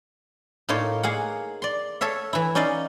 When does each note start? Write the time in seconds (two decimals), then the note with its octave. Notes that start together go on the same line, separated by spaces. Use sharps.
0.69 A2 A#3 D#4 F4 C#5
1.03 A#3 G#4 F5 F#5
1.62 D5 C6
2.01 A4 C#5 E5 F5
2.33 E3 E4
2.55 C#4 D#4 D5 D#5 F5